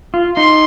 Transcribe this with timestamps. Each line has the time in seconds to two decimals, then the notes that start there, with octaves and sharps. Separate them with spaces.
0.14 F4
0.36 D#4 C6